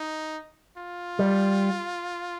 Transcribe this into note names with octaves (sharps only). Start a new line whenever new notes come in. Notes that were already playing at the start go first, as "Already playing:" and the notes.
Already playing: D#4
F4
G3